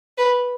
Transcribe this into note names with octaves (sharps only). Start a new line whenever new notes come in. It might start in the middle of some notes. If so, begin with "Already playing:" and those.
B4